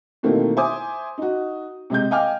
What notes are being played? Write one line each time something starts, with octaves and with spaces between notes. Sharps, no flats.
B2 D#3 E3 A3 A#3 C4
C5 E5 G#5 D6 D#6
D#4 F#4
C3 G#3 D#5 G6
D#5 F5 G5 G#5 D6 F6